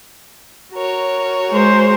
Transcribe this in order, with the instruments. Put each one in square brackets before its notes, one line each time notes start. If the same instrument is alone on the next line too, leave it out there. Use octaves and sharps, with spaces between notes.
[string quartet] F#4 A#4 C#5
[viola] G#3 C5